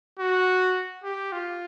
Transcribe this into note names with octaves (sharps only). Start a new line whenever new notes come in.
F#4
G4
F4